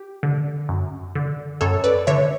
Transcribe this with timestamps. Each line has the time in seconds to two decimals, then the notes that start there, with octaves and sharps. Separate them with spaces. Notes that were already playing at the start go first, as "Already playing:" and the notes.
Already playing: G4
0.23 D3
0.69 F#2
1.15 D3
1.61 F#2 A4 C#5
1.84 B4 D5
2.07 D3 C#5 E5